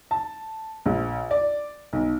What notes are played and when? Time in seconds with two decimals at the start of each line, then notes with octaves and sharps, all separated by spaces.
0.11 A5
0.86 A#1
1.31 D5
1.93 B1